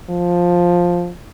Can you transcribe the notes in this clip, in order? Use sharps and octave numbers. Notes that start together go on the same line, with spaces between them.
F3